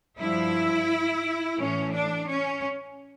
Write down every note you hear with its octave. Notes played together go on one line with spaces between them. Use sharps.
G2 F3 E4
A2 E3 C#4
D4
C#4